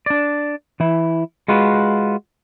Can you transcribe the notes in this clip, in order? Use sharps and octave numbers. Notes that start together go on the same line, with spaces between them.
D4 D5
E3 E4
G#3 F4 F#4 B4